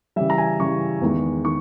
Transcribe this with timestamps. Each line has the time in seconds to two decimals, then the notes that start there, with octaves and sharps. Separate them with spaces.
0.16 C#3 E3 G3 E5
0.30 A#5
0.38 G#5
0.59 C#3 E3 G3 C#6
1.01 E2 D#3 G#3
1.45 D#3 C#6